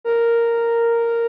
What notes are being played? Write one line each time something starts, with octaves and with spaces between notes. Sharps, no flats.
A#4